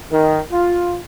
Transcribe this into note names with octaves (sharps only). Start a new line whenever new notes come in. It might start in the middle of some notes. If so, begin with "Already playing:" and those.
D#3
F4